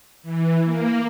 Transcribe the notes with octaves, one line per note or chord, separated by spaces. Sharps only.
E3
A#3